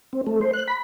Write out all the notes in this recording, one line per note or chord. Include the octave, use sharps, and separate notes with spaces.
C4
A3
C5
F#6
B5